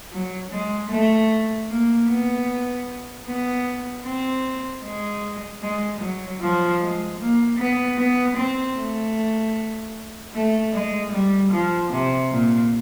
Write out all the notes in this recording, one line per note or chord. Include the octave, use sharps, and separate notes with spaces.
F#3
G#3
A3
A#3
B3
B3
C4
G#3
G#3
F#3
F3
G#3
A#3
B3
B3
C4
A3
A3
G#3
G3
F3
C3
A#2